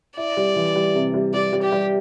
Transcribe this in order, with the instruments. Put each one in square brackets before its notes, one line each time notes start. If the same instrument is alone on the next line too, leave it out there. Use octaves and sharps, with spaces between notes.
[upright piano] E4 [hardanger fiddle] D5
[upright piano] G3
E3
G3
C3
G3
[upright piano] G3 [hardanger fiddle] D5
[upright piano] G3
[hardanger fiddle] G4
[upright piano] G3